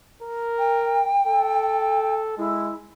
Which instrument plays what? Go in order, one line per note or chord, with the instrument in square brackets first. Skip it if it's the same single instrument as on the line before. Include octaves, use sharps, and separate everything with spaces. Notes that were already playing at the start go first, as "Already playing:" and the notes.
[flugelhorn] A#4
[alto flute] G5
[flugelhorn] A4
[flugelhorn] G#3 [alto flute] E4